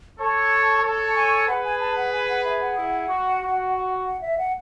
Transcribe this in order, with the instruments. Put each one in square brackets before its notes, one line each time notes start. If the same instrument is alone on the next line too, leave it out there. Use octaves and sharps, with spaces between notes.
[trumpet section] A4 C#5 [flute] A5
[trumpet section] A4 C#5 [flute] A5
[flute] G#5
[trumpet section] G#4 B4 [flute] F#5
[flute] G#5
A5
F#5
G#5
F#5
E5
F#5
[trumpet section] E4 G#4
F#4
F#4
[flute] F#5
E5
F#5